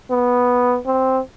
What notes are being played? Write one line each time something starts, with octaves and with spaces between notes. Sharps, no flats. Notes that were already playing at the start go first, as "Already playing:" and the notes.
B3
C4